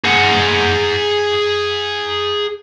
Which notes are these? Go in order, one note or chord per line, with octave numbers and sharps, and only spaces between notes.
G#4 F#5